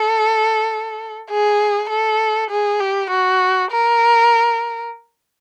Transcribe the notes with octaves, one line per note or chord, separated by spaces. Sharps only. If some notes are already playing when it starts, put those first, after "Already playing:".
Already playing: A4
G#4
A4
G#4
G4
F#4
A#4